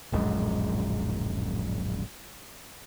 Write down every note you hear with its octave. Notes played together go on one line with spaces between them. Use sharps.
D1 A#1 F#2 G#3